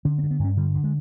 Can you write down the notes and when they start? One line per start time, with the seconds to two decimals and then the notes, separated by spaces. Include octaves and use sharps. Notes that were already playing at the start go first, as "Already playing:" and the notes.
0.05 D3 C#4
0.19 C4
0.23 G2
0.31 B3
0.39 G2
0.44 C#4
0.57 D3 G3
0.75 D3
0.84 G#3